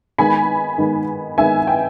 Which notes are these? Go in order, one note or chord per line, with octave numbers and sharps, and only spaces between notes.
D#3 G#3 B3 G#5 B5
D#3 G#3 B3
D#3 G#3 B3 E5 G#5
G5